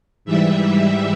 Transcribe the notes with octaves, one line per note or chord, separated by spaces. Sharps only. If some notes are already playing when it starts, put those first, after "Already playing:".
G#2 E3 G3 E5